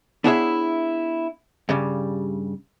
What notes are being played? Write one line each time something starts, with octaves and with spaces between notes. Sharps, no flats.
B3 D4 E4 G#4 C#5 E5
G2 C#3 G3